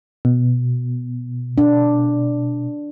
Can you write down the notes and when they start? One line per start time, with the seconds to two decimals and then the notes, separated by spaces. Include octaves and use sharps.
0.25 B2
1.58 D4